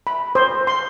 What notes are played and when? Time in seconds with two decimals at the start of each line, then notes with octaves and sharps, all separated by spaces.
0.07 B5
0.35 C5
0.67 C6